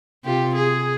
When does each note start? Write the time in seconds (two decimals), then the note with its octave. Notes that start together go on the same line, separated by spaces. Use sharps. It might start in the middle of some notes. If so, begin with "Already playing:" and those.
0.24 C3 F4 G4
0.55 G#4